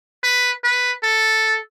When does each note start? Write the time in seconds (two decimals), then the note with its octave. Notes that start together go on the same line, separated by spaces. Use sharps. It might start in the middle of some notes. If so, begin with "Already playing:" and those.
0.24 B4
0.64 B4
1.03 A4